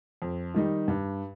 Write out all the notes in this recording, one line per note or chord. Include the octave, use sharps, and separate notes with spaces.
F2
D#3 G3 D#4
G2